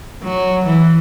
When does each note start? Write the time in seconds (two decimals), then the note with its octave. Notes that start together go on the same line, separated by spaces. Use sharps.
0.23 F#3
0.65 E3